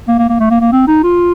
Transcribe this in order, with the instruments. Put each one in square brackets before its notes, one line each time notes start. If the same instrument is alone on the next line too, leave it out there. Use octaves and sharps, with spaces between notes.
[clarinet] A#3
A#3
A#3
A3
A#3
A#3
C4
D#4
F4